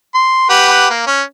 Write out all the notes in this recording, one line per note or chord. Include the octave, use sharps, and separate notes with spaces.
C6
G4 B4 F#5
A#3
C#4